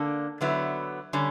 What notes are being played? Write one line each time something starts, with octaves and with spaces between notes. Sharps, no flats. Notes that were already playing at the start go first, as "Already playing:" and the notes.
Already playing: D3 A#3 D4
D3 F#3 B3 E4
D3 G3 C#4